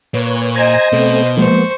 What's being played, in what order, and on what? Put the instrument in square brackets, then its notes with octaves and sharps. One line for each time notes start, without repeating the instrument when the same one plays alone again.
[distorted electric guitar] A#2 [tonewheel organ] B4 C#5
[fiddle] C5 D#5 [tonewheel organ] G#5 A#5 G#6
[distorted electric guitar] B2 [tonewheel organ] A3 C4
[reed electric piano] F3 G#3 A#3 [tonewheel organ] B3 [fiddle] C5 C#6